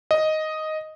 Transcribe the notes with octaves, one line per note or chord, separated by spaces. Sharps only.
D#5